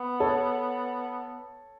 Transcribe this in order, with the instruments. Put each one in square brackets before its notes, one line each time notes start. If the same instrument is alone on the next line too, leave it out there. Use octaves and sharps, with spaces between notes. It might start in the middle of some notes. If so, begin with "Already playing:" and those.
Already playing: [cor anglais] B3
[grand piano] A4 C#5